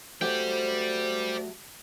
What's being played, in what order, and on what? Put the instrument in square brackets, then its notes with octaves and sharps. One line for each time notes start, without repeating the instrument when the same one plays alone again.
[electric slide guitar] F#3 A3 G4 [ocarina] C5 [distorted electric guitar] D5 G5